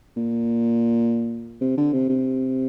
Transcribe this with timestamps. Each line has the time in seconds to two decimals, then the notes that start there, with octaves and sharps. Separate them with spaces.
0.17 A#2
1.61 C3
1.78 D3
1.93 C3
2.09 C3